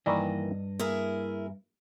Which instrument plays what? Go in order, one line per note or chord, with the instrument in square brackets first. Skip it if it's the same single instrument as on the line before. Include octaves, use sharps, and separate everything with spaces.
[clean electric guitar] G2 D#5 [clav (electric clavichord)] D#3 E3 A#3 [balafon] D5
[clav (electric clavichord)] A#3 [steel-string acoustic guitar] E4 G#4 A#4